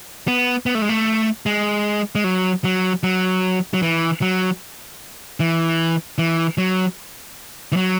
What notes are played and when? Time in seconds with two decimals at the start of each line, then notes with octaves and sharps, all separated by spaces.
0.28 B3
0.66 B3
0.75 A3
0.82 G#3
0.89 A3
1.46 G#3
2.15 G#3
2.24 F#3
2.64 F#3
3.03 F#3
3.74 F#3
3.82 E3
4.22 F#3
5.40 E3
6.18 E3
6.58 F#3
7.72 E3
7.76 F#3